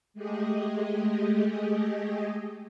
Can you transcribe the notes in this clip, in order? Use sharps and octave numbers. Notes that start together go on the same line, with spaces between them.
G#3 A3 G4 G#4 D#5